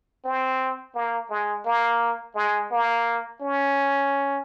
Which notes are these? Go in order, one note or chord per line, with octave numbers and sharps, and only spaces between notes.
C4
A#3
G#3
A#3
G#3
A#3
C#4